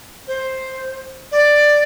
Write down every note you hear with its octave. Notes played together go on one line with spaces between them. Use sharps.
C5
D5